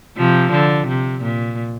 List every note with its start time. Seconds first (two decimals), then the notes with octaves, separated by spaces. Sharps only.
0.17 C3 F3
0.52 D3
0.88 C3
1.22 A#2